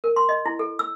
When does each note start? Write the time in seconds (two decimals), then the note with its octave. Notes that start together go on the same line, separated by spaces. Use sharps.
0.04 A#4
0.16 C6
0.29 D#5
0.46 E4
0.59 A4
0.79 E6